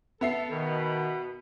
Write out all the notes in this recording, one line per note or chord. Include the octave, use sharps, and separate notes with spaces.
B3 A4 E5 C7
B2 D#3 B5